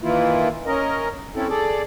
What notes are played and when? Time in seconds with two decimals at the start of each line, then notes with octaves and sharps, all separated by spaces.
0.03 D#3 E3 A#3 E4 F4
0.66 C#4 A#4 D#5
1.36 C4 C#4 E4 A4
1.49 G#4 A4 D5